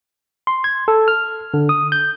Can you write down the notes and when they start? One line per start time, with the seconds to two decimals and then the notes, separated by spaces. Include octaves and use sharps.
0.47 C6
0.64 G#6
0.88 A4
1.08 F6
1.54 D3
1.69 D#6
1.92 G6